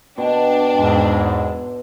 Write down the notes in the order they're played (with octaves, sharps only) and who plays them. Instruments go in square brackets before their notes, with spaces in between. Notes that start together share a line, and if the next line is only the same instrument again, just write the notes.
[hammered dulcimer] B2 [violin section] D4 [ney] G5
[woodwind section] E2 G#2 G#3